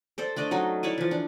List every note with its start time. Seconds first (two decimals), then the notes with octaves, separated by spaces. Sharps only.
0.18 A4 C5 D5
0.36 A3 D4 D5 D#5
0.51 F#3 C#4 D#4 A4
0.83 E4 C#5 D5 G#5
0.98 E3 F3
1.11 D4